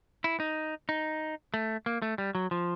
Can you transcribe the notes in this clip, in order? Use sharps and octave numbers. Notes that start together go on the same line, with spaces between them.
E4
D#4
D#4
A3
A#3
A3
G3
F#3
F3